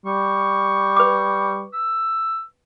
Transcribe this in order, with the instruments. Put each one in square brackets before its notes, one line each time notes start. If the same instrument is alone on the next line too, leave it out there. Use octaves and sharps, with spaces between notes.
[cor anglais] G3 [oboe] C#6
[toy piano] B4 D6
[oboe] E6